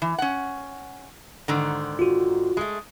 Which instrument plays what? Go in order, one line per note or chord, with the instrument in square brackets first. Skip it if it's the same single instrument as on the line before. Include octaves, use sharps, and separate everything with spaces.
[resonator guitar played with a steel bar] E3
C#4 F#5
G#2 D3 D#3
[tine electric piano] F4 F#4
[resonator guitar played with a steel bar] G#3 A3